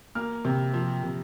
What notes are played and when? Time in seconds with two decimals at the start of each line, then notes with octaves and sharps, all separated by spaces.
0.15 A#3 F6
0.45 C3
0.74 F3
1.03 C3